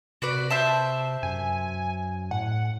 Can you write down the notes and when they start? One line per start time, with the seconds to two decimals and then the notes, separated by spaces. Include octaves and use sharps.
0.22 C3 F#4 B4 D5
0.50 C5 E5 A5
1.23 F#2 G#5
2.31 A2 F#5